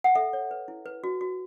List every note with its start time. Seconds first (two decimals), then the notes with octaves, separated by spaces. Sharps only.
0.04 F#5
0.15 A4 E5
0.33 C#5
0.51 B4
0.68 E4
0.86 B4
1.04 F#4
1.21 F#4